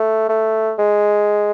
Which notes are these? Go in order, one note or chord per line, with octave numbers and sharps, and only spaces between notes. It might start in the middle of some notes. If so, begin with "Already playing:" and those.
Already playing: A3
A3
G#3